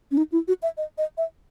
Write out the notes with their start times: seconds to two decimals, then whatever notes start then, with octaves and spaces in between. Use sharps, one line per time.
0.11 C#4
0.17 D#4
0.32 E4
0.48 F#4
0.62 E5
0.77 D#5
0.98 D#5
1.18 E5